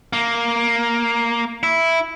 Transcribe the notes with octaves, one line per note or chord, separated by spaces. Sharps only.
A#3
E4